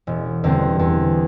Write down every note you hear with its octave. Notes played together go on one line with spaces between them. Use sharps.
E1
E2 D3 G3 C4
E2